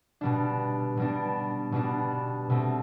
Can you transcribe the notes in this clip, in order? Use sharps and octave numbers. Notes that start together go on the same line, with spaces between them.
B2 G3 B3 D4
B2 G3 B3 D4
B2 G3 B3 D4
B2 A3 C4